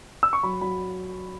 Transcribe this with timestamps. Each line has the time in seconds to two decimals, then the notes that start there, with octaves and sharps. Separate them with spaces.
0.23 E6
0.33 C#6
0.43 F#3 B5
0.61 F#3 B5